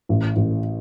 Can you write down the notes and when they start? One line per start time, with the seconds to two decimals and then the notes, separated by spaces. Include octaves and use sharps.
0.09 A1
0.36 A1